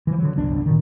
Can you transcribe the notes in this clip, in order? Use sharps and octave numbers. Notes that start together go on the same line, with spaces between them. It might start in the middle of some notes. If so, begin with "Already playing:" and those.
E3 F3
D3 F#3
G1 C2 F2 D4
A#2 D#3